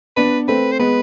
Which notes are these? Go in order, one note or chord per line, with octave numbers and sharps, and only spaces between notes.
B3 D4 B4
A3 C4 B4
C5
G#3 B3 B4